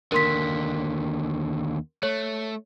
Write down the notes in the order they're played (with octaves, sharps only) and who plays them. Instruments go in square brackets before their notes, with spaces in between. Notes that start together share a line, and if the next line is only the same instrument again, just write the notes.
[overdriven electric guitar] D#2 D3 [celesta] A#4 C6 B6
[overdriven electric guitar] A3 [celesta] C#5